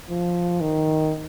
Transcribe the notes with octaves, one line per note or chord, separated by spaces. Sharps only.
F3
D#3